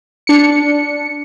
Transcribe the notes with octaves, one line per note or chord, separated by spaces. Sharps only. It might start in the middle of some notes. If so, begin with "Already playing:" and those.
D4 C#7